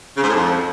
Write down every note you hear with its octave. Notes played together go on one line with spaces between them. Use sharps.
C#3
G#2
A2
F2